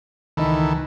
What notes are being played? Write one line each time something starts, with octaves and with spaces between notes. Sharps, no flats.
C#2 D#3 E3 D#4 A4 B5